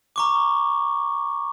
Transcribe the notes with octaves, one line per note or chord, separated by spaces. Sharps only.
A#5 C#6 D6